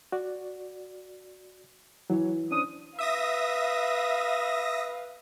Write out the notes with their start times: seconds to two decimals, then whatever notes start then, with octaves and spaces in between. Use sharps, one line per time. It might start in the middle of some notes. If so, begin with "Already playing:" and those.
0.12 F#4 D5
2.10 E3 F#3 C#5
2.51 C#4 D4 C5 D#6
2.99 B4 E5 F5 D#6 A#6